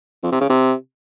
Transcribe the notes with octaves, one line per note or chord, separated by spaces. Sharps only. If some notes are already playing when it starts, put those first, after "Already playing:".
F2
C3
C#3
C3